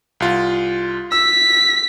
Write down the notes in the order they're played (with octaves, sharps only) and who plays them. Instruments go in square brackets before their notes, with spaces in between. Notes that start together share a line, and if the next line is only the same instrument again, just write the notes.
[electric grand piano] C2 F4
[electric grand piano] E6 [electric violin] B6